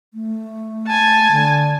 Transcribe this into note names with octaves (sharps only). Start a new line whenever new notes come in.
A3
G#5 A5
D3